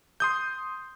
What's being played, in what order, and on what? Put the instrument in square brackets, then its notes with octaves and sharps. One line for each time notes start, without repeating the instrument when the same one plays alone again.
[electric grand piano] C6 D#6 G6